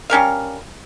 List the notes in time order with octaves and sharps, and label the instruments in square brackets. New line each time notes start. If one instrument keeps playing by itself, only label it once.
[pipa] G3 C#4 A#4 F5